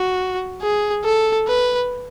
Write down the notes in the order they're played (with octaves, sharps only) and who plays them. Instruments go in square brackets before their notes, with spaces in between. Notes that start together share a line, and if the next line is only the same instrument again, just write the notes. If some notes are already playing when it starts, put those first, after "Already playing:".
Already playing: [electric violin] F#4
G#4
A4
B4